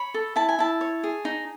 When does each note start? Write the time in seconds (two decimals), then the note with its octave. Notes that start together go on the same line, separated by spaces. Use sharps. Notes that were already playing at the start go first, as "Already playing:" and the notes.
Already playing: C#5 B5
0.14 A4
0.36 E4 A5
0.49 G#5
0.59 E4 A5
0.81 C#5
1.03 G#4
1.25 D#4